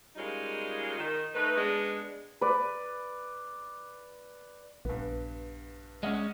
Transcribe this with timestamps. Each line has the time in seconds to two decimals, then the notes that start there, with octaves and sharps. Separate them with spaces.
0.16 G3 G#3 A#3 C#4 D#4 F4
0.97 D#3
1.35 A3 D#4 B4
1.56 G#3 B3 D4
2.41 B4 D5
4.85 A#1 G2 B3
6.03 G#3 C#4 D#5 F#5 F6